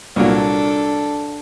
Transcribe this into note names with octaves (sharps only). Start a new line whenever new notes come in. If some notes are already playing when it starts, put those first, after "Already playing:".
C2 A#2 F#3 D4 A4